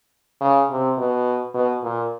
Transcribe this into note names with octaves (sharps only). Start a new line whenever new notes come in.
C#3
C3
B2
B2
A#2